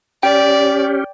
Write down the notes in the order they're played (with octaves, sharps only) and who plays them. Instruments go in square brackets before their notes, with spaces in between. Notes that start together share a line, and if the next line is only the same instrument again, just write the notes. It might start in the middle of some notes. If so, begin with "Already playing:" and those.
[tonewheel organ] C#4 G4 [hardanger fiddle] D5 [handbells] G5